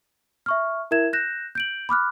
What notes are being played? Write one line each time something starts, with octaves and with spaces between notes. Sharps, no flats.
E5 C#6 F6
E4 A#4 E5 G#6 E7
F#6 G6 A#6 E7
G6 D7 F#7
B5 D6 F6 F#6